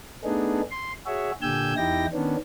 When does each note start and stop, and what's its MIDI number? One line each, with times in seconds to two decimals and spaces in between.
0.24 0.61 57
0.24 0.61 59
0.24 0.61 62
0.24 0.61 63
0.24 0.61 68
0.71 0.92 84
1.06 1.31 66
1.06 1.31 68
1.06 1.31 73
1.06 1.31 76
1.42 1.74 46
1.42 1.74 50
1.42 1.74 67
1.42 1.74 80
1.42 1.74 88
1.42 1.74 91
1.77 2.06 40
1.77 2.06 63
1.77 2.06 64
1.77 2.06 67
1.77 2.06 79
1.77 2.06 94
2.13 2.36 51
2.13 2.36 59
2.13 2.36 61
2.13 2.36 62